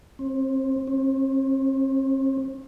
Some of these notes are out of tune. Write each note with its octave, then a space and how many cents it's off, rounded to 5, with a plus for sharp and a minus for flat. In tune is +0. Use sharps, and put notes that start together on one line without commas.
C4 +30
C4 +45